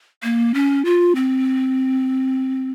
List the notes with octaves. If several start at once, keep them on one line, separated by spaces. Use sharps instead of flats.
A#3
C#4
F4
C4